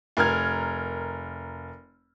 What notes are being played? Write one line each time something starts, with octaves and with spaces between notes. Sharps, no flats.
F1 A#4 F6 G#6